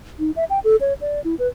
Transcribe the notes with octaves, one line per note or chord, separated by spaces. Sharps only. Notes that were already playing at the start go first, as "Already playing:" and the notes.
D#4
E5
G5
A4
C#5
D5
E4
B4